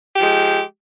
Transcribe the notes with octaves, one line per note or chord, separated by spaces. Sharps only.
F3 G#3 G4